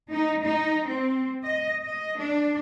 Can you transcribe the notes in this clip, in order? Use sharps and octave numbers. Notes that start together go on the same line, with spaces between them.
D#4
D#4
C4
D#5
D#5
D4